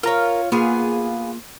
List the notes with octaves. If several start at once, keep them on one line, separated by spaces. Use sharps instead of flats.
F4 A#4 C#5 A#5
A#3 B3 F4 G#4 F5